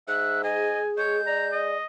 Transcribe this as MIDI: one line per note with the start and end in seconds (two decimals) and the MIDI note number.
0.08 0.85 44
0.08 0.41 76
0.08 0.41 90
0.44 1.22 68
0.44 0.80 75
0.44 0.89 80
0.98 1.78 56
0.98 1.17 73
0.98 1.59 91
1.26 1.77 74
1.26 1.46 82
1.52 1.85 75